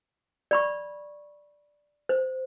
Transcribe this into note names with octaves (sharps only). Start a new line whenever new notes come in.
D5 B5 C#6
C5